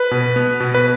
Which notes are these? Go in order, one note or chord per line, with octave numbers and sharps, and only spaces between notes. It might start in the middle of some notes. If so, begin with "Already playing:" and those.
Already playing: B4
B2
B3
B2
B4